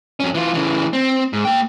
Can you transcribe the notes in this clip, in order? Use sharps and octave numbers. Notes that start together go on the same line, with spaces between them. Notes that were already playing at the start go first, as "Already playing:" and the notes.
F2 C#4
E3 F4
C#3 E3
C4
G#2
A#3 G5